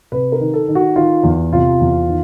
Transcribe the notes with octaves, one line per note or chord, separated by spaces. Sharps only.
C3 B4
A#4
D#3
A4
D#3
F#4
D#3 F4
E2
C3 F4
E2
D#3